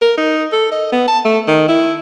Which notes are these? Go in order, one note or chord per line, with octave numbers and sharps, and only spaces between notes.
A#4
D#4
A4
D#5
B3
A5
A3
D#3
E4